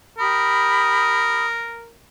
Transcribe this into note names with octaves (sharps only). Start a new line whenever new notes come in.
G4 A#4 B5 D#6